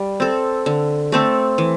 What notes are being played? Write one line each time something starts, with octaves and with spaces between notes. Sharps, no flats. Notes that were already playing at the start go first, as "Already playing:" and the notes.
Already playing: G3
C4 A4
D3
A3 C4 A4
E3